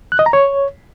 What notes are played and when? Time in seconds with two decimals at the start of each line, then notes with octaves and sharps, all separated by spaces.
0.12 F#6
0.19 D#5
0.26 A#5
0.33 C#5